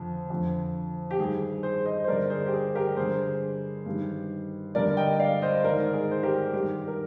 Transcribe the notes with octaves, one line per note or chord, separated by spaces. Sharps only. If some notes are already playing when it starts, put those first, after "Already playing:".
Already playing: F2 D3
F2 D3
G4
G2 D#3 G#4
G#4 C5
C5 D#5
C5
G2 D3 A#4 D5
G#4 C5
G4
G#4
G4 A#4
G2 D3 G#4 C5
G2 D#3
G2 D3 A#4 D5
D#5 G5
D5 F5
C5 D#5
G#2 D#3 A#4 D5
G#4
C5
G4 A#4
G2 D#3 G4
A#4